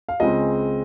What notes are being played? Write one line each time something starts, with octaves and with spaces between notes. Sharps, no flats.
F5
C#2 C#3 G#3 C4 D#5